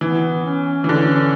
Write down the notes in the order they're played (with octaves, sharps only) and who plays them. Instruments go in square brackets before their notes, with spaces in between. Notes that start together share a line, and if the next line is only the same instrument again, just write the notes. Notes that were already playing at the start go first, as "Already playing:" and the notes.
[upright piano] E3 [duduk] B3
[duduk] C#4
[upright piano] E3
[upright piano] D3 [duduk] C#4